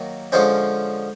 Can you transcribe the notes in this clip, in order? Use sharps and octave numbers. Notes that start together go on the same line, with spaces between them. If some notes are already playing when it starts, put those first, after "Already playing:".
Already playing: D#3 F#3 A#3
D3 F3 G#3 C#4 C5